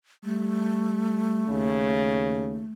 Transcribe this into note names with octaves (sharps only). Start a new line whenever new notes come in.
G3 A3
D#2 C#3